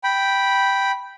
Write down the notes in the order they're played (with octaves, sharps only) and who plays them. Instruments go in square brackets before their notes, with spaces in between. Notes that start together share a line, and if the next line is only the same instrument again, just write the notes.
[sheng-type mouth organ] G5 B5